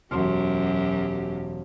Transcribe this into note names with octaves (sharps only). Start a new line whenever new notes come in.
E1 F#2 G4 C6 F6